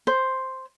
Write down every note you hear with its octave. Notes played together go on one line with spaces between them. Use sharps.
C5